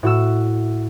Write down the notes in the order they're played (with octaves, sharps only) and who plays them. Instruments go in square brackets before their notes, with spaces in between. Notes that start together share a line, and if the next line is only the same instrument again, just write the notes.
[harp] A2 F#4 E6